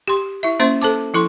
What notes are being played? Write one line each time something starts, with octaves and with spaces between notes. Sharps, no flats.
G4 C6
E4 E5
A#3 C#4 C5 E5 C6
A4 C5 A5 D6
F3 E4 A4 C6